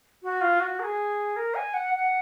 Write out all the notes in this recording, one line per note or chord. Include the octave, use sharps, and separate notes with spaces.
F#4
F4
F#4
A#4
G#4
A#4
G#5
F#5
F#5